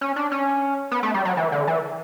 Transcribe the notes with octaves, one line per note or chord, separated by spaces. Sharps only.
C#4
D4
C#4
B3
A3
G3
F#3
E3
D3
E3